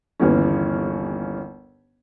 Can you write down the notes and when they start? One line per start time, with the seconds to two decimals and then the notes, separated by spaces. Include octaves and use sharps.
0.20 G1 D#2 E3 B3 C#4